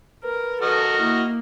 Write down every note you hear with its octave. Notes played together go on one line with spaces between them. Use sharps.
A#4 B4
F#4 A4 D#5 F6
A#3 E4